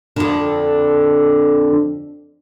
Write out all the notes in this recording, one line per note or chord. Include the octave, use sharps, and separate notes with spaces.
F2 D3